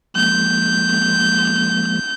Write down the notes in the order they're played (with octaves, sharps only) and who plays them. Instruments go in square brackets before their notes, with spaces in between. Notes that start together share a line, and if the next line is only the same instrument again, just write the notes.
[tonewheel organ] F3 G#3 A#3 [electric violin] G6